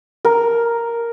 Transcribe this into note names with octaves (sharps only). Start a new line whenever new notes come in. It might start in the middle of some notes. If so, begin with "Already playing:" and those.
A#4